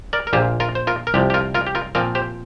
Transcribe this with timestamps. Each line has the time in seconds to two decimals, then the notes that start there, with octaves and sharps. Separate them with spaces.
0.13 A#4 D5
0.27 A#4
0.33 A#1 A#2 A#3 F4 G4 C5
0.60 F4 A#4
0.75 C5
0.87 F4 A#4
1.07 A#4
1.14 C2 C3 F3 G4
1.30 G4
1.34 F4 A#4
1.54 F4 A#4
1.67 G4
1.75 F4 A#4
1.95 A#2 F3 C4 F4 A#4
2.15 G4 C5